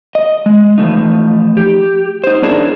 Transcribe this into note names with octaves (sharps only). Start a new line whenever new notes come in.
D#5
G#3
E3 F3 A3 D#4
G4
D#4 C5
B3 C#4 D4 E4 G#4 A#4